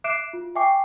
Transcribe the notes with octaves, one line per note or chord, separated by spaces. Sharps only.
E5 D6 F#6 C7 D7 E7
F4
E5 G5 G#5 C#6 D6 C7